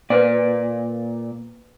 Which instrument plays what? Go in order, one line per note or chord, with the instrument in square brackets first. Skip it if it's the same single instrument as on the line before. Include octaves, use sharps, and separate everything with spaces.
[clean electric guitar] A#2 D5 [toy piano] B4 C5 F5